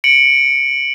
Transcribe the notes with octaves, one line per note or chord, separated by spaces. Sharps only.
C#7 D7 F#7